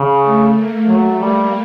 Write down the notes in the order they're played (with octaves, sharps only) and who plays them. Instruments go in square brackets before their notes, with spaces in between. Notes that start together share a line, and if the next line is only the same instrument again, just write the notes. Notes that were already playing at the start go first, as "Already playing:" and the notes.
Already playing: [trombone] C#3
[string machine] A3
A#3
[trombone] F#3 [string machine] A3
[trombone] G3 [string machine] A#3